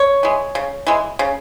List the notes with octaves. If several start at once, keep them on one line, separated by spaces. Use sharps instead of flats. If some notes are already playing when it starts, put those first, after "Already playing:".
Already playing: C#5
E3 G#3
C#3
E3 G#3
C#3